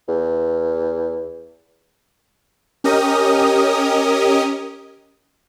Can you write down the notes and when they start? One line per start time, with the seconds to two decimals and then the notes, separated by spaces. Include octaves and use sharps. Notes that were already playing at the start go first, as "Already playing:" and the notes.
0.08 E2
2.84 C#4 G4 A#4 D#5 D#6